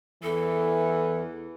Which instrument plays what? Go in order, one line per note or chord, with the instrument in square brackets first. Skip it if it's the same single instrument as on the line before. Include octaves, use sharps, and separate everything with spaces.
[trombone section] E2 E3 [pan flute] A4